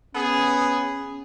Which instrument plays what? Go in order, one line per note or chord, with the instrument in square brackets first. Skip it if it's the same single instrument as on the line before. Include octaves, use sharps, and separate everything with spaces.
[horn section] B3 G#4 [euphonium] C#4